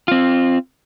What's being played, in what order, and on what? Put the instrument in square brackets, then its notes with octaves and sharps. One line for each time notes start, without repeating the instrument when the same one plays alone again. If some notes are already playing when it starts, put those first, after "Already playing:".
[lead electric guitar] C4 F4